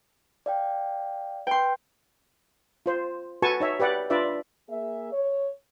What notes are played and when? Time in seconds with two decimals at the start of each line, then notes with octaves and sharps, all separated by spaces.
0.46 D5 F5 G5
1.47 B4 G5 C6
2.86 F4 C5
3.42 F#4 A4 B4 G#5 A5 C#6
3.60 D#4 C#5 E5
3.80 G4 B4 D5 F#5
4.10 D4 F4 B4 D5 E5
4.69 A#3 G#4 E5
5.12 C#5